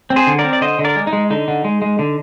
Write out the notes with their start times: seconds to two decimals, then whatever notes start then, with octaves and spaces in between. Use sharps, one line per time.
0.10 C4
0.16 G#4 C5
0.27 D3
0.39 A#4 D5
0.44 C4
0.53 D5
0.61 D3 C5 D#5
0.79 D3
0.84 A#4 D5
0.96 G#3
1.07 D#4
1.13 G#3
1.30 D3 D#4
1.48 D3
1.64 G#3
1.82 G#3
1.99 D3